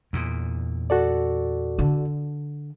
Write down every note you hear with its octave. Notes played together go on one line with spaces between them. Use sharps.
E2 A#2
F#4 A4 D5
D3